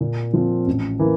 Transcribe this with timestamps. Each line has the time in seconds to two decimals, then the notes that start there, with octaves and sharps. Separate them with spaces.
0.01 A#2
0.33 F3 C4 F4
0.67 A1
0.99 E3 A#3